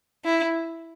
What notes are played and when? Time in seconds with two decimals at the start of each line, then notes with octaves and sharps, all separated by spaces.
0.25 E4